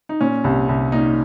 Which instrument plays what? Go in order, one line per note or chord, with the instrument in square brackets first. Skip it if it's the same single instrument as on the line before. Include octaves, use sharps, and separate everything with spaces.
[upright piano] D#4
A#2 C#4
C2
C2
A#2 D#4